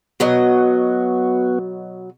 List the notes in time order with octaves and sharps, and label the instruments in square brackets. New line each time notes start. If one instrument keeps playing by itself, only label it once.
[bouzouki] B2 F#3 D#5 [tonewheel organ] B3 F#4